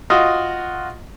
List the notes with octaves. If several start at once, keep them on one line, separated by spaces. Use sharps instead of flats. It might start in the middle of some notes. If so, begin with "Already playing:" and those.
F4 F#4 D#5